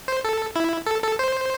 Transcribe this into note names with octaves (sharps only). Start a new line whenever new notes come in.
C5
A4
E4
A4
A4
C5